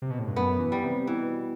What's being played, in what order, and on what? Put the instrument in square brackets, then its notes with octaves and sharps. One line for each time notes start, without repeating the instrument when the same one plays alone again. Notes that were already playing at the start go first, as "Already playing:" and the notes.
[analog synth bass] C3
B2
A2
G2
[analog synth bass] F#2 [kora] B3
[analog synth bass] E3
[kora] G3
[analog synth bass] C3
[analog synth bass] B2 [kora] E3